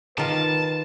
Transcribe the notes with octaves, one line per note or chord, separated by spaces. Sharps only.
D#3 F4 B4 A5